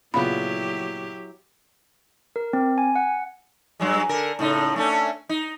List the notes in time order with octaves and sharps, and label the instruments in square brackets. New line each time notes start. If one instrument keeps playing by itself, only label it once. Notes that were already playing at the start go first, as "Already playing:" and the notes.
[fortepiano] A#2 C#3 B3 [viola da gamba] F#3 E4 G4 [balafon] B5
[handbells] A#4
C4
G#5
F#5
[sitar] G2 F#3 G#3
D3 A#4
A2 C#3 D#4
A3 C#4 D4
D#4